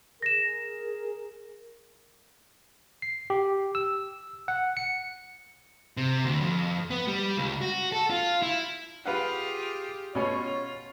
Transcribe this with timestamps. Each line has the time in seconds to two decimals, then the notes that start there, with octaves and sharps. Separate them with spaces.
0.22 G#4 A#4 A#6 E7
3.02 C7
3.30 G4
3.75 E6
4.48 F#5
4.77 C#7
5.97 C3
6.25 D2
6.41 F2
6.91 B3
7.08 G3
7.37 C#2
7.61 F#4
7.92 A4
8.10 F4
8.42 E4
9.06 F4 G4 G#4 B4 F5 F#5
10.15 B2 C#4 F4 C#5